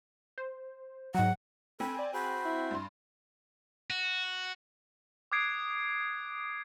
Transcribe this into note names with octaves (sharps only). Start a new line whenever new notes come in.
C5
G#2 F#3 F#5
C4 A4 G#5 B5
D5
F#4 G#4 C5 B5
E4
G2 C6
F#4
D6 D#6 F#6 G#6 C7 D7